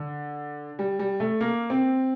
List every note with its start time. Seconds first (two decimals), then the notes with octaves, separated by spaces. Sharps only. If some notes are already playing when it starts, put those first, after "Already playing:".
Already playing: D3
0.79 G3
0.99 G3
1.20 A3
1.41 A#3
1.70 C4